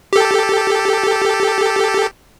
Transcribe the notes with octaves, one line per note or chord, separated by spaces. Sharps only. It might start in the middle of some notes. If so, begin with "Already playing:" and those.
G4 A4